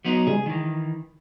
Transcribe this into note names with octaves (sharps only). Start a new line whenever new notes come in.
F#3 B3 D#4
C#3 G3 G#3 G#4
D#3 E3